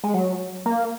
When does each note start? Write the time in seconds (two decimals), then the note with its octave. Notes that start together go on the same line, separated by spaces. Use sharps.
0.04 G#3
0.14 F#3
0.66 A#3